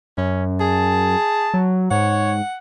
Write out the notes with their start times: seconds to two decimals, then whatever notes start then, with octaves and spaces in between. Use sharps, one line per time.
0.18 F#2 C#4
0.60 G#4 A5
1.54 F#3
1.91 G#2 C#5 F#5